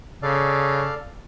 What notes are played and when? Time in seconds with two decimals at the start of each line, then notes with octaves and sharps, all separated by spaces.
0.22 C#3 A4 D5 F5